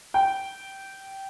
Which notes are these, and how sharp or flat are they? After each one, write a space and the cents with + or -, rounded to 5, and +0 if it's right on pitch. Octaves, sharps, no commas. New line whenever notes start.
G5 -15